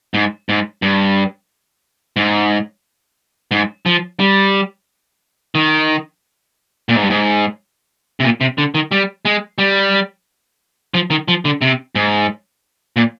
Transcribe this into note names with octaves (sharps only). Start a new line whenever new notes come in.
G#2
G#2
G2
G#2
G#2
F3
G3
D#3
A#2
G#2
G2
G#2
C3
A#2
C3
D3
D#3
G3
G#3
G3
F3
D#3
F3
D3
C3
G#2
A#2